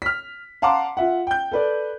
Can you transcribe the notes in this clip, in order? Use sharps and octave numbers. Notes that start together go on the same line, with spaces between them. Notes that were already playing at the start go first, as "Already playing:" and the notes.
F6 B6
F5 F#5 A5 A#5 C6 D6
F4 E5 F#5
G5 G6
A4 B4 D5